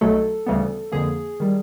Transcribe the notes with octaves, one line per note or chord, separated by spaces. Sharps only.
B1 B2 F#3 A3 A4
D2 C#3 E3 G3 B3
F2 D3 F3 A#3 G#4
D#3 G3